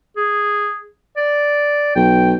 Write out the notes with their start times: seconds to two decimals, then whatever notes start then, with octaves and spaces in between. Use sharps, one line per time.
0.17 G#4
1.17 D5
1.96 B1 G5